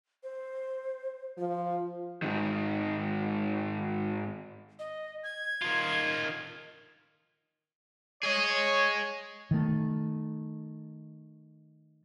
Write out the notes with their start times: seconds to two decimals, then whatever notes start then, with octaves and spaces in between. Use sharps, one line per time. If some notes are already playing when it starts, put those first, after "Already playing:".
0.23 C5
1.38 F3 F4
2.22 G#2 D#3
4.79 D#5
5.24 G#6
5.62 D#3 F4
8.23 G#4 C#5 D#5
9.51 D#3 A3